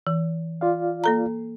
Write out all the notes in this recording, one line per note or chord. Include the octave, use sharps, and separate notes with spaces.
E3
F4 D5 F5
A#3 A4 A#5